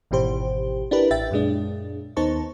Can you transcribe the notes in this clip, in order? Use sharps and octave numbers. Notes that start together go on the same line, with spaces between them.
G#1 B2 E3 G4 C5
D4 E4 G4 A#4 B4
A1 E5 G5 A6
F#2 A#2 G#3 D4
D#2 B3 D#4 C5 A5 C#6